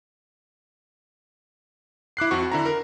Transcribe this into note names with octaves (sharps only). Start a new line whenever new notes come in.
E4 D6 F#6 C7
F2 C4 F#4 C#6
D3 E4 A#5
A#4